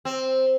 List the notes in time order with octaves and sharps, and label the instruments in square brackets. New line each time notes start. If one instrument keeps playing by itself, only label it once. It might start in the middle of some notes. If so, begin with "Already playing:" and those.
[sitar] C4